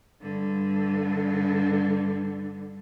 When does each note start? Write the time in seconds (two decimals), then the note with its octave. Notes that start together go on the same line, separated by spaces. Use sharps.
0.21 G2 D3